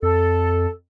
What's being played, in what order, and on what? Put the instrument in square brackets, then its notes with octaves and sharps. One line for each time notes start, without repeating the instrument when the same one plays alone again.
[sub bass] F2 [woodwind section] A4